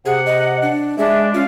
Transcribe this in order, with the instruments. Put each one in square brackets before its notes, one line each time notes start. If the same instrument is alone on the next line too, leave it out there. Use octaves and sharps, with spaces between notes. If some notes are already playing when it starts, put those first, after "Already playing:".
[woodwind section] C3 F#5 [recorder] G#4
[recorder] D#5
D4
[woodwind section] G#3 D4 [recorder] E5
[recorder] C#4 [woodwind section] F4 F5